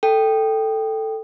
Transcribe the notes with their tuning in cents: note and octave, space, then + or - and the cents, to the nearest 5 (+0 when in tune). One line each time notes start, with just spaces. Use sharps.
A4 +5 G5 +0